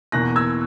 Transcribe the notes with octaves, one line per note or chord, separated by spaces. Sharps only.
E2 B2 A#3 F#6 A#6
E6 G#6